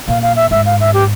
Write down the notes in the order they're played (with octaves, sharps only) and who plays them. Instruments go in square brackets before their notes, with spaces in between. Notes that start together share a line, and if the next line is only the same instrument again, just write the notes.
[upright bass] A#2 [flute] F5
[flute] F5
E5
[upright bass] G#2 [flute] E5
[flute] F5
E5
G4